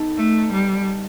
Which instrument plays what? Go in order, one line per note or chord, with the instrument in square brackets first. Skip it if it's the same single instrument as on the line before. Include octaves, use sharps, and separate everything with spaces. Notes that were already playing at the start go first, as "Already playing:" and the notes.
Already playing: [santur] B3 D#4 A4
[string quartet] A3
G3